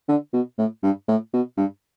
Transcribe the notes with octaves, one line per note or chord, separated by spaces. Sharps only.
D3
B2
A2
G2
A2
B2
G2